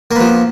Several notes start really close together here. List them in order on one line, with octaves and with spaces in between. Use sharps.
A#3 B3 F3